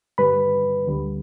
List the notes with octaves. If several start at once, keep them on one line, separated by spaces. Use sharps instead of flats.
G2 D3 G3 B4 B5
D2 D3 G3